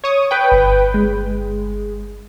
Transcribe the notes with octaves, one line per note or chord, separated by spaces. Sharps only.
C#5 C#6 D#6
B4 G5
G1
G#3